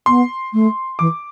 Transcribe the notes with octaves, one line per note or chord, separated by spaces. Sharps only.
B3 C6
A3
E3 D6